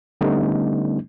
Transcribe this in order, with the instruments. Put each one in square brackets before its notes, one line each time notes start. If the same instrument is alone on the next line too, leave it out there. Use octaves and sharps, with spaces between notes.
[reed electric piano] D3 G3 A3 B3 C#4 D#4